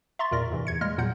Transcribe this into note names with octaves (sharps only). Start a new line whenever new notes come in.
E5 A#5 C6 C#6 A6
E2 A#2 A#4 D5 A#6
F2 G#2 C3 E3
E2 G#6 C#7
G3 G#3 A#3 D#5 F6 A#6
E2 A#2 F#3 F#5 G6 C#7